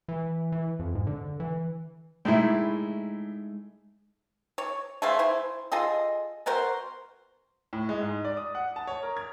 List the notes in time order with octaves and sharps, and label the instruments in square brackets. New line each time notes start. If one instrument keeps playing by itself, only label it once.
[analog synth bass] E3
E3
F2
G#2
D3
E3
[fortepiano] A2 E4 [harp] G#3 A3 D#4
[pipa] C#5
A3 G#4 C5 F5
E4 C5
F4 G#4 A4 D#5
B3 F#4 A#4 C5
[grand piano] A2
G#3
G#2
D5
D#6
F#5
A5
C#5
A#4
G#6